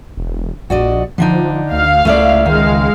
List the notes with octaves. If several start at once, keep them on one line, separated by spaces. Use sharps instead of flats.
E1
A#1 F#4 D5 D#5
D3 F3 D4 D#4
D2 F5
C#2 A3 E4 D5
D#3 G#3 F5